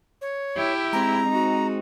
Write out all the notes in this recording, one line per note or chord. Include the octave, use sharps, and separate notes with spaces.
C#5
E4 G4 E5
G#3 C4 A#5
D#4 F#4